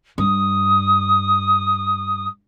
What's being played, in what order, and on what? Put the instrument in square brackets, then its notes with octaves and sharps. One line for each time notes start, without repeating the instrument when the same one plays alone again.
[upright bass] G2 [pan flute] D#6